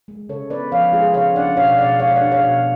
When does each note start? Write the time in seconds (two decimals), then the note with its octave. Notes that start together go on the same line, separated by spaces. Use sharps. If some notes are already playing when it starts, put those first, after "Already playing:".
0.08 G#3
0.29 C#3 A4 C#5
0.50 B3 B4 D5
0.72 F3 C#5 F5
0.93 G#3 F4 G#4
1.14 C#3 C#5 F5
1.35 D4 D5 F#5
1.57 B2 C#5 F5
1.78 B2 D5 F#5
1.99 G#3 C#5 F5
2.16 D4 D5 F#5
2.32 C#5 F5
2.42 B2